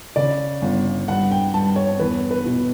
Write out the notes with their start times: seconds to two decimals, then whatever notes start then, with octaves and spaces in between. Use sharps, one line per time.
0.16 C#3 D5
0.62 G1
1.08 G2 F#5
1.31 G5
1.54 G2 A5
1.76 C#5
2.00 E2 B4
2.31 B4
2.45 B2